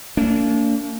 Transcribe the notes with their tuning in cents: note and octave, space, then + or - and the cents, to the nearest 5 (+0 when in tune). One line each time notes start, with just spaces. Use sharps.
A#3 -40 D4 -40